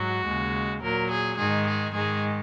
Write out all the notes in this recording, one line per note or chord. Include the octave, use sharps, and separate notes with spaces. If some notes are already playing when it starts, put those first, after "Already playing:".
Already playing: G#2 F#3 F#4
D#2 C#3 G#3
A#2 F#3 A#4
G#4
G#2 D#3 G#3 G#4
G#4
G#2 D#3 G#3 G#4